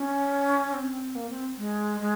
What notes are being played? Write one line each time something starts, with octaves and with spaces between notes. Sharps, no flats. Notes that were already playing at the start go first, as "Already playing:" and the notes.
Already playing: C#4
C4
A#3
C4
G#3
G#3